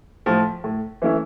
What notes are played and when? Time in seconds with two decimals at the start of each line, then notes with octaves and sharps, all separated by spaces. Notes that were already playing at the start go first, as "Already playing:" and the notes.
0.26 A2 F3
0.64 A2
1.02 E3 A3 C#4 E4